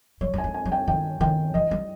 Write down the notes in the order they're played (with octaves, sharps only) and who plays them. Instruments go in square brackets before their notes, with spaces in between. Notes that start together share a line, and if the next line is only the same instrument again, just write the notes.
[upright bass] G3 [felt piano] C#5
[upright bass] G3
[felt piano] G#5
[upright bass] G#3
[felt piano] G#5
[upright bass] G3
[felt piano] G5
[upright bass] D#3 [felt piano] G5
[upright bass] D#3 [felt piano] G5
[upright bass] E3 [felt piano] D#5
[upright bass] G3